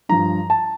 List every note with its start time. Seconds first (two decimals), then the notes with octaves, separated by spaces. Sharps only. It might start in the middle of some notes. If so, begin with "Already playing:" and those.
0.09 G2 F3 A#5
0.50 A5